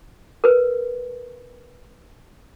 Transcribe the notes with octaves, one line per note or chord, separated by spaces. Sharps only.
A#4 B4